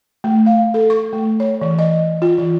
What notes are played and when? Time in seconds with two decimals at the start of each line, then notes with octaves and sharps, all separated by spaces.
0.24 A3
0.46 F5
0.74 A4
0.90 C#6
1.13 A3
1.40 C#5
1.61 E3
1.79 D#5
2.22 F4
2.38 E3